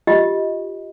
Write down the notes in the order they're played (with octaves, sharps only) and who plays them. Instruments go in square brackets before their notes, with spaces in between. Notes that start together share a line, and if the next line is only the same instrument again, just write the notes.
[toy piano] F4 G4 D#5